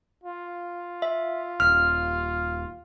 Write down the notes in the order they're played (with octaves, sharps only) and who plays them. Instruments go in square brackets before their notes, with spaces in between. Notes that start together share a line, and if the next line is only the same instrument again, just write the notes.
[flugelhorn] F4
[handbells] E5
[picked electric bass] D#1 [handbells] F6